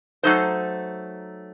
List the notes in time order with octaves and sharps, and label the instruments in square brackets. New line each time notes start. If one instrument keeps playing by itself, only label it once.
[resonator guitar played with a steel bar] F#3 A3 D#4 A4 C5